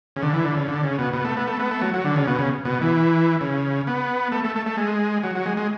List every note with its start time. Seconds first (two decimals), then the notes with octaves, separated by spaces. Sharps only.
0.16 C#3
0.23 D3
0.34 E3
0.45 D3
0.57 C#3
0.68 D3
0.83 C#3
0.99 B2
1.13 B2
1.25 A3
1.37 B3
1.47 A3
1.60 B3
1.71 A3
1.82 F#3
1.94 F#3
2.05 D3
2.16 C#3
2.27 B2
2.39 C#3
2.65 B2
2.81 E3
3.41 C#3
3.87 B3
4.32 A3
4.44 A3
4.56 A3
4.66 A3
4.77 G#3
5.23 F#3
5.35 F#3
5.46 G#3
5.57 G#3